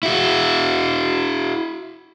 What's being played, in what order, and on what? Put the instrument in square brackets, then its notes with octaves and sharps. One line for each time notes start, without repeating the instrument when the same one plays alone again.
[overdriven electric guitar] E4 F#4